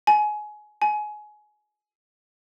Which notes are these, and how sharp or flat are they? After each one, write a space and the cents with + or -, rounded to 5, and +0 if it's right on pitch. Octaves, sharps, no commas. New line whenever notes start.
G#5 +25
G#5 +25